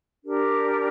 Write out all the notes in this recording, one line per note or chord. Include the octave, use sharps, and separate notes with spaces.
D4 G4 A#4